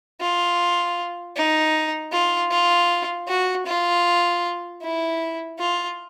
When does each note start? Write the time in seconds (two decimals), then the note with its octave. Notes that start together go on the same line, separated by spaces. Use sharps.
0.21 F4
1.36 D#4
2.12 F4
2.51 F4
3.28 F#4
3.66 F4
4.82 E4
5.59 F4